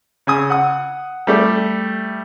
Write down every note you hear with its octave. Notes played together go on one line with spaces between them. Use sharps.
C#3 G#5 D#6
F#5 D#6
G3 A3 D5